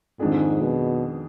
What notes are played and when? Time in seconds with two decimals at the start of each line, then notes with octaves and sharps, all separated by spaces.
0.19 F2 G#2 D#3 G#3 D4 G#4
0.62 B2